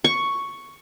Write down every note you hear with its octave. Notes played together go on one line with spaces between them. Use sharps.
C#6